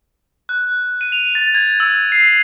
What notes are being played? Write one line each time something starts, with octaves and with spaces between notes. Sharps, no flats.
F#6
D#7
F7
A6
G#6
E6
C7